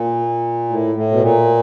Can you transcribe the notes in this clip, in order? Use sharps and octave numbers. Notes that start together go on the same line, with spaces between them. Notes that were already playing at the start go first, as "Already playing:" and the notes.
Already playing: A#2
A2
A2
B2
A#2